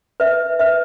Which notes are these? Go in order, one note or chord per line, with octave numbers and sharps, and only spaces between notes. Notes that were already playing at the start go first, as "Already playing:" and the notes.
B4 E5
B4 E5